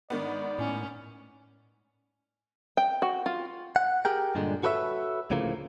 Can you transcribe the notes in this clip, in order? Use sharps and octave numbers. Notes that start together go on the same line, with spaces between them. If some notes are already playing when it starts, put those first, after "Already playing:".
G#2 D#3 B3 D5
A2 C#4
G5
F#4
F4
F#5
G4 G#4 A#4 G5
G2 A#2 D3 G#3
F#4 A4 B4 C#5 D#5 E5
D2 A2 C#3 F3 A#3